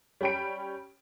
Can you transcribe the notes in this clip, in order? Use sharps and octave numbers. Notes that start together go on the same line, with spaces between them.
G3 C#4 G5 B5 D7